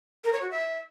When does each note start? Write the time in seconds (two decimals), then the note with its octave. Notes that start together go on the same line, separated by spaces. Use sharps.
0.24 A#4
0.33 C#5
0.42 F#4
0.50 E5